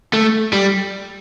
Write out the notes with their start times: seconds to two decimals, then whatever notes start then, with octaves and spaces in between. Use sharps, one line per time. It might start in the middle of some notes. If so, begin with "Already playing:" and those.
0.13 A3
0.53 G3